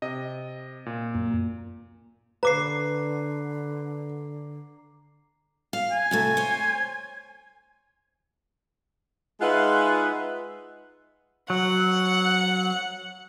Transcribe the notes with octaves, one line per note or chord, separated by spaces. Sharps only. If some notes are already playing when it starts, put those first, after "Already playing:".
C3 D#5
A#2
F#2 A#3
D3 B4 A#5 D6 C7
F5
G#5
A2 C3 A3
C5 C#5
G#3 D#4 F4 B4 E5 F#5
F#3 F#5